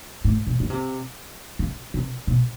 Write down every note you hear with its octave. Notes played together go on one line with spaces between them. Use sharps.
A2
B2
C#3
C3
C#3
C3
B2